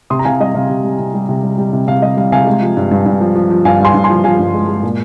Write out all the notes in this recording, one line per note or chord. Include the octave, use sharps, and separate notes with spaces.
C3 C6 D#6
A#5
C3 F5 G#5
G3 D#5
C3 F5
C3
G3
C3
G3
C3
G3
G3
C3
C3 F5
G3 D#5
G3 F5
C3 F5 G#5
G#3
F3
G2
G2
G2
F3
F3
F3
G2 F5 G#5
G2 G#5 C6
G2
G#5 C6
F3
F3 F5 G#5
G2
G#3
G#3
A#2